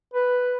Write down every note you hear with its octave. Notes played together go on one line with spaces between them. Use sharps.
B4